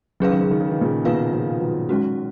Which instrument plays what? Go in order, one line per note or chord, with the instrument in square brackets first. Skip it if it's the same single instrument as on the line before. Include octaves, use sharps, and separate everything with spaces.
[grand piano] C#3 [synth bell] F#3 C#4 G#4 B4 F5
[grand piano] D#3
C#3
D#3
C#3
D#3
A#2 C#3
[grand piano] B2 D#3 [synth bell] A#3 F4 B4 F5
[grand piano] C#3 F3
D#3 F#3
[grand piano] D#3 F#3 [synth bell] G#3 C#4 F#4